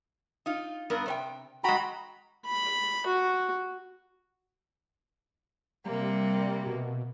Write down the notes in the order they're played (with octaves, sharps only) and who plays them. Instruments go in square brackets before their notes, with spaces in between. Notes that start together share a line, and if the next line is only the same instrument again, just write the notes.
[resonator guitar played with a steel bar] D#4 F4
G2 B3 A#4
C3 C#5 G5
[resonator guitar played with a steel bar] G#3 G5 [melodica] F#4 A#5 B5
[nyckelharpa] B5
F#4
[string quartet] C3 A#3 [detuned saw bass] G3
[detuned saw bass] B2